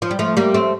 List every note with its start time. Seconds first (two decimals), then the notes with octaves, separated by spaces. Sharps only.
0.02 F3
0.11 G3
0.19 F3 A3
0.37 G3 A#3
0.54 A3 C4